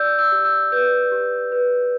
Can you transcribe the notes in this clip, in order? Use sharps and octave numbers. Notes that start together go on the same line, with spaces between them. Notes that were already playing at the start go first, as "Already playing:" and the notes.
Already playing: D5 E6 G6
E6 G6
G4
E6 G6
B4 E6 G6
G4
B4